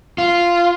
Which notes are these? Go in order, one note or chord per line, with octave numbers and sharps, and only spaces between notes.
F4